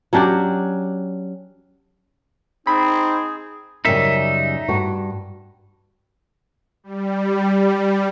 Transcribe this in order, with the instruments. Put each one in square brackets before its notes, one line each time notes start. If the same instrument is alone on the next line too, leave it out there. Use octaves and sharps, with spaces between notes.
[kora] F#3 C#4 D4 G4
[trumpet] C4 [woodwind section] D#4 [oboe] G#4 [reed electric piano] B5
[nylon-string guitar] F#2 C#3 G3 [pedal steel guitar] D#4 E5
[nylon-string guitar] G2 F#4
[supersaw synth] G3